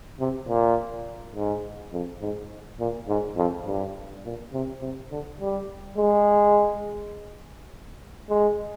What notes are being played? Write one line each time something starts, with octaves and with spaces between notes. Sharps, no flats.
C3
A#2
G#2
F2
G#2
A#2
G#2
F2
G2
A#2
C3
C3
D3
G3
G#3
G#3